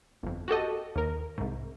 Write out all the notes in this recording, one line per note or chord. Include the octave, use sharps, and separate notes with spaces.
G1 F2
F#4 G4 A4 D#5
D#2 A#4
C2 G#2